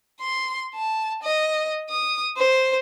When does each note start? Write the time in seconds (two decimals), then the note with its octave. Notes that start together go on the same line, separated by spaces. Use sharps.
0.20 C6
0.76 A5
1.23 D#5
1.89 D#6
2.37 C5